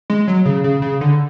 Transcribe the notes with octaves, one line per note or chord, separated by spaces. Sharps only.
G#3
F#3
C#3
C#3
C#3
D3